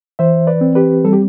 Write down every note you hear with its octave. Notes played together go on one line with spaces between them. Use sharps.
E3 C5 E5
B4 D5
C4
G4 B4
G3 A4
G4